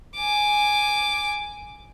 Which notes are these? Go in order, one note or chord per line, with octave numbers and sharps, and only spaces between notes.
G#5 D6